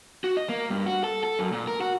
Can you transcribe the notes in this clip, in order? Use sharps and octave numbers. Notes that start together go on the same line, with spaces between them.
F#4
D#5
A#3
G2
F#4
A4
A4
F#2
A#2
A#4
F#4